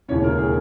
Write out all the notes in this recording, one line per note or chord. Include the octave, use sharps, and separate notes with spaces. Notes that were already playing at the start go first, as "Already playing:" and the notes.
E1 D#2 C#3 E3 C#4 C#5
A#4
G#4